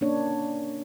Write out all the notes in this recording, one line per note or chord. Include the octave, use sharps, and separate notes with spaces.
A#3 C#4 D4 C#5